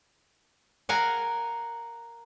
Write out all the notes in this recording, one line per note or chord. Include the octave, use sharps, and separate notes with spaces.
A#4 F5 F#5 G#5